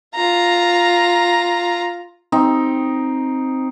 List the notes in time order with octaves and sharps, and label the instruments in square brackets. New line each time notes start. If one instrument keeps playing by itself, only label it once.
[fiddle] F4 A#5
[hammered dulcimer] C4 D#4